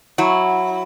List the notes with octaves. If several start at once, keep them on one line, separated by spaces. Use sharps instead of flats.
F#3 E4